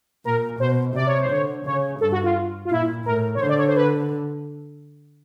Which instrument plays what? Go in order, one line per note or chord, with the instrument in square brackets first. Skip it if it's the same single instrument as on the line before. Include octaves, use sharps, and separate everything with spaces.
[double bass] A#2 [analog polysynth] A#4
[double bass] B2 [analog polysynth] C5
[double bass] C3 [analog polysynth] D5
[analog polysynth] C#5
C5
[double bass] D3 [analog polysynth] C#5
[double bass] C#3 [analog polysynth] C#5
[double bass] G2 [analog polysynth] A4
[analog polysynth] F#4
F4
F4
[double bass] A#2 [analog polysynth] E4
[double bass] A2 [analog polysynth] A#4
[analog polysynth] C#5
[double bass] D3 [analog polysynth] C5
[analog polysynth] D5
C#5
C5
B4